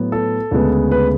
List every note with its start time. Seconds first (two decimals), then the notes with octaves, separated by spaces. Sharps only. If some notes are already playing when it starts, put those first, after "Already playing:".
Already playing: A2 F#3 B3
0.12 A4
0.51 D2 C#3 G#3 B3
0.92 B4